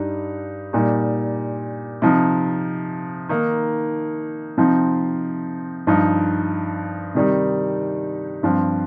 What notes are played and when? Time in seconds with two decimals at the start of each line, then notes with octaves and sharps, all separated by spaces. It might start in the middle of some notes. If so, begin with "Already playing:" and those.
Already playing: G2 G3 D#4
0.73 A#2 G3 D#4
2.02 C3 F3 D#4
3.29 D#3 A#3 D#4
4.57 C3 F3 C4 D#4
5.87 G2 F3 D#4
7.15 C3 D#3 G3 D#4
8.43 G2 F3 C4